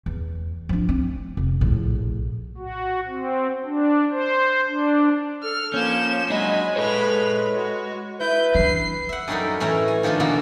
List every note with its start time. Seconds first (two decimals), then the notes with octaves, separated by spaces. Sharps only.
0.06 E2
0.69 F3 D4
0.89 C4
1.37 F1
1.61 A#1 A2
2.58 F#4
3.08 C4
3.64 D4
4.11 C5
4.67 D4
5.43 A4 F6
5.74 F3 A#3 C#4 G6 E7
6.30 F#3 G#3 D4 D#5 G#5 B5
6.76 A4 B4 C#5 B5 F7
7.55 F#4
8.20 E4 B4 G6
8.55 E3 D4 C7
9.09 E5 F#5
9.28 F#2 G3 C#4 D#4 A4 A#4
9.60 A2 E3 C#4 E5 A#5
9.88 G#5
10.03 D#3 F3 A3 D4 F4
10.20 E2 B2 D3 A3 A#3 F#4